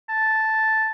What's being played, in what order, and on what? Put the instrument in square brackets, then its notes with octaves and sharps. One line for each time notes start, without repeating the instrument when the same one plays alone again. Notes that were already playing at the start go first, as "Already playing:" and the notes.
[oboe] A5